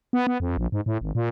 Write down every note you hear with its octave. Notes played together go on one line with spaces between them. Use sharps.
B3
B3
F2
A#1
G#2
A2
G#1
A#2